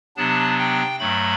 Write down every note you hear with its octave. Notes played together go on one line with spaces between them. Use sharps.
C3 F#3 B3 D4 A5
G5
G2 F#3 A3 B5